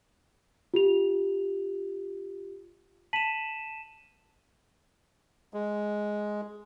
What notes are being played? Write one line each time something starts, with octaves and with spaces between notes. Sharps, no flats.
F4 G4 F7
A5 B6 D#7 E7 F#7
G#3